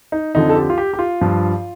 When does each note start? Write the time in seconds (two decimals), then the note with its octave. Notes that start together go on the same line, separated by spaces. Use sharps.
0.12 D#4
0.35 F2 D3 F3 D#4
0.49 A4
0.56 G4
0.70 F4
0.78 G4
0.94 G4
0.99 F4
1.21 G2 F3